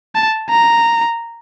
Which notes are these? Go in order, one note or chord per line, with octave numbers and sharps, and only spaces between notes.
A5
A#5